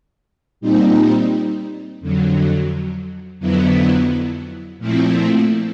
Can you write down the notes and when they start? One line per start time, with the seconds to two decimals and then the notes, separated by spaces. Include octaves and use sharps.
0.61 A#2 G3 C4 D#4
2.01 F2 D3 F#3
3.39 F2 D3 F#3 B3 E4
4.79 A#2 F3 A3 C4 E4